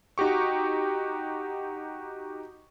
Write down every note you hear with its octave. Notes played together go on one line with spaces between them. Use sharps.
D#4 F#4 G4 C#6